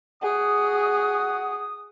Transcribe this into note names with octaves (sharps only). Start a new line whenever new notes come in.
F#4 G#4 F#5 D#6